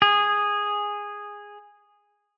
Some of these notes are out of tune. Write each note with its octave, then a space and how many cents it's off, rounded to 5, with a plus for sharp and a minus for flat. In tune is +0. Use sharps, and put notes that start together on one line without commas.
G#4 -10